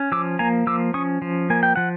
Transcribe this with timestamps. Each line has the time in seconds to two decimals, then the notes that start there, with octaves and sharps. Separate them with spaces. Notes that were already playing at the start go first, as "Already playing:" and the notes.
Already playing: C#4
0.12 F3 D6 E6
0.39 A#3 G#5 A#5
0.67 F3 D6 E6
0.94 C#4 C#6 D#6
1.22 F3
1.50 A#3 G#5
1.63 G5
1.76 F3 F#5